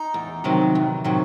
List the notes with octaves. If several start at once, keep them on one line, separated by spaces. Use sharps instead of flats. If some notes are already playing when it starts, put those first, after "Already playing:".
Already playing: D#4
E2
C3 D#3 F#3
E2
C3 D#3 F#3